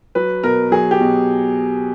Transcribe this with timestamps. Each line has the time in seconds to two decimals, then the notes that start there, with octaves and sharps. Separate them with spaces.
0.15 F#3 B4
0.43 B2 A#4
0.71 F#3 G#4
0.91 G4
1.01 B2